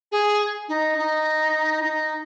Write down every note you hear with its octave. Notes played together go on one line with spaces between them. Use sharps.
G#4
D#4
D#4
D#4